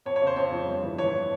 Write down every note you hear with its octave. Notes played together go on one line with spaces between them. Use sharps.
F2 C#5
C#5
C#3 C5
F2 C#5
F3
G2
E3
E3 C#5